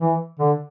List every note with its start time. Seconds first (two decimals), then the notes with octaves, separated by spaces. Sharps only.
0.01 E3
0.39 D3